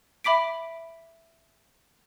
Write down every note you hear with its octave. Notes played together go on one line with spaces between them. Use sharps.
E5 B5 D6 B6 D7